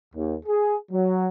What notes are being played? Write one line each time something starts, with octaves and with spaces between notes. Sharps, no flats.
D#2
G#4
F#3